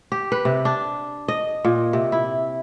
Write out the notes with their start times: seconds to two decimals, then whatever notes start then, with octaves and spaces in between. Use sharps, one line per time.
0.12 G4
0.32 B4
0.45 C3
0.65 D4
1.28 D#5
1.64 A#2
1.93 C3
2.12 E4